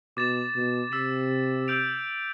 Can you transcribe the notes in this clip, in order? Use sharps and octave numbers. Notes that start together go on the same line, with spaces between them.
B2 D6 A6 E7
B2
C3 E6 B6 E7
E6 G6 D7 F7